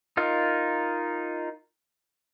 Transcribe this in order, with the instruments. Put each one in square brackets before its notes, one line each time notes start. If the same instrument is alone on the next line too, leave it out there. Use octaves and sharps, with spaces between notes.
[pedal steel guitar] D#4 F4 A#4